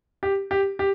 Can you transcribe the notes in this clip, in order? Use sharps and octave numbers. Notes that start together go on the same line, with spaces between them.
G4
G4
G4